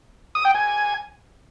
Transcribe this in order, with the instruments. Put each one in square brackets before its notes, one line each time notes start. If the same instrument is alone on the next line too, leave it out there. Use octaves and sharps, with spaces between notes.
[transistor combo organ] D#6
G5
G#5